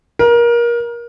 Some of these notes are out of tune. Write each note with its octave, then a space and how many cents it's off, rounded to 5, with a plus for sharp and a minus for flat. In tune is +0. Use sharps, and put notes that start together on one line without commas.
A#4 +25